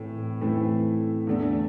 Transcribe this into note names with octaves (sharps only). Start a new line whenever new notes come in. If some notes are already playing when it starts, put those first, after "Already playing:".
Already playing: A2 E3 A3 C4
A2 E3 A3 C4
E2 D3 A3 D4